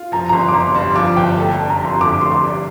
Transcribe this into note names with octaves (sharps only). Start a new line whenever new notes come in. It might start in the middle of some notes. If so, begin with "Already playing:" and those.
Already playing: F4
F3 A#5
A#5
G1 C6
D6
G1 C6
G2 C6
F3 D6
G1 G5
A3 A5
D4
A#5
F2 C6
D3 D6
A3 C6
D6
D4